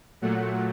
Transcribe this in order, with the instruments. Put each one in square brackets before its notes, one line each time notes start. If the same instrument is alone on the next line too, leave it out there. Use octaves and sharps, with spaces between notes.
[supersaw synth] A#2 F#3 A3 F#5